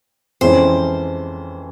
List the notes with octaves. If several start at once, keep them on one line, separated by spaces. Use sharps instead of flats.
F2 E3 G#3 C#4 C5